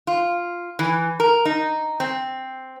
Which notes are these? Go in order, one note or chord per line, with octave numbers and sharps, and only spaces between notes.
F4
E3
A#4
D#4
C4